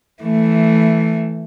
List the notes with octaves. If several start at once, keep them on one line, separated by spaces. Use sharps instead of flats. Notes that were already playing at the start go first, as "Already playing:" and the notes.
E3 A3